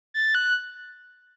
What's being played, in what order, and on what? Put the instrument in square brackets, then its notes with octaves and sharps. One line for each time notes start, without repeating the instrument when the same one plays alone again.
[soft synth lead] A6
F#6